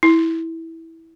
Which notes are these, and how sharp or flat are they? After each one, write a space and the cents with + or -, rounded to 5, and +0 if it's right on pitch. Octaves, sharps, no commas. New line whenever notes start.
E4 -10